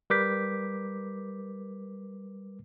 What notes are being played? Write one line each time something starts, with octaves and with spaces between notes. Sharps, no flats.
G3 A#4 B4 D6 G6 B6